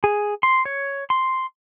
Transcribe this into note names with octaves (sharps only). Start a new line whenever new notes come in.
G#4
C6
C#5
C6